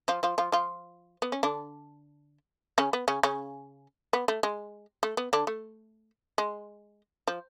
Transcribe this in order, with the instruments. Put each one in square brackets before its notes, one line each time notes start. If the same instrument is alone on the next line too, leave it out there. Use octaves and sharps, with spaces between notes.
[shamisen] F3 F4
F3 F4
F3 F4
F3 F4
B3
C#4
D3 D4
C#3 C#4
B3
C#3 C#4
C#3 C#4
B3
A3
G#3
A3
B3
D3 D4
A3
G#3
F3